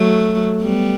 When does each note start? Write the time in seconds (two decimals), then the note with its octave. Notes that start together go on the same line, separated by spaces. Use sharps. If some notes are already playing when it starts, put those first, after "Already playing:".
Already playing: F#3 A3
0.62 G3 B3